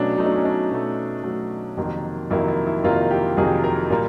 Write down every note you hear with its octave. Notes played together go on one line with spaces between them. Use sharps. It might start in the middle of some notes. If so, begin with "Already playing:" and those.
Already playing: B2 F#3 A3 C#4 D4
B2 F#3 A3 D#4
D4
C#4
D4
B2 F#3 A3
B2 F#3 A3
F2 C3 D#3 F#3 A#3
F2 C3 D#3 F#3 A#3 E4
E4
E4
F2 C3 D#3 F#3 A#3 F4
G4
F2 C3 D#3 F#3 A#3 G#4
A#4
A#2 G3 A#3